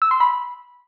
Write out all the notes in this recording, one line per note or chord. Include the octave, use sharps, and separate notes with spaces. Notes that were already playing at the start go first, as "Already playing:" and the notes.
E6
C6
B5